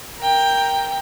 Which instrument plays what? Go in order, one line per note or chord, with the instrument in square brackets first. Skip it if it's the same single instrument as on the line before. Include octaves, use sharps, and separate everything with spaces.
[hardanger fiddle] A#4 G5